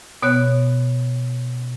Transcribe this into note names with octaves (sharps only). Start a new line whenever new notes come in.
B2 B3 C#5 F#6